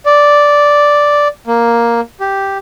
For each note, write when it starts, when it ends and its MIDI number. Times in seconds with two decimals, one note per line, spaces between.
0.06 1.28 74
1.47 2.01 58
2.20 2.58 67